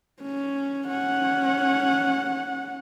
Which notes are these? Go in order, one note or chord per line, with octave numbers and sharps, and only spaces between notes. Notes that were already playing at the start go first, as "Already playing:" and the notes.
C#4
C#4 F#5